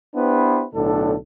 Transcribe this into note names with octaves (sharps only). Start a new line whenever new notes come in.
B3 D4 E4 G4 B4 C5
B1 A2 D3 D4 A4